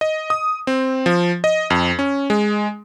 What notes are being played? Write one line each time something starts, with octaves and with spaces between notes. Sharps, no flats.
D#5
D#6
C4
F3
D#5
F2
C#4
G#3